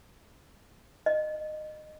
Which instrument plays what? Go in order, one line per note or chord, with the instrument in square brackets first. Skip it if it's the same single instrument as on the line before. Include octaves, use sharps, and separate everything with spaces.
[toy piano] D#5